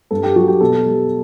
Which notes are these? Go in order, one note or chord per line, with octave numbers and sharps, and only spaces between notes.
G2 A4
G4
F#3 F#4
G4
B2 A4
G3